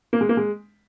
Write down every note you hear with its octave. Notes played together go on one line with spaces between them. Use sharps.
A#3
G#3
A#3
G#3